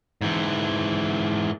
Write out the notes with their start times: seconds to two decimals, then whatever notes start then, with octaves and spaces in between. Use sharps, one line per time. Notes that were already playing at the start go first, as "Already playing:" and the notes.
0.21 G#2 E3